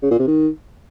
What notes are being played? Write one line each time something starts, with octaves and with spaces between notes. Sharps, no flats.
C#3
A#2
C3
D#3